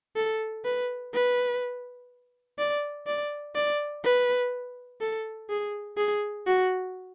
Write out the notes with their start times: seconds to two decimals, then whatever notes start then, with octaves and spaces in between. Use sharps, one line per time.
0.16 A4
0.65 B4
1.13 B4
2.59 D5
3.07 D5
3.56 D5
4.04 B4
5.01 A4
5.50 G#4
5.98 G#4
6.46 F#4